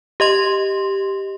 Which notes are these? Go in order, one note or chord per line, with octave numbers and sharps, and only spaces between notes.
G4 D#5 C6